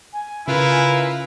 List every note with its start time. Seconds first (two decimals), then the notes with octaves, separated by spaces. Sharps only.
0.13 G#5
0.47 C#3 E4 F4 A#4 B4